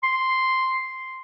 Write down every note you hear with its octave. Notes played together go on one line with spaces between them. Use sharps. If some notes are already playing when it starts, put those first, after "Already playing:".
C6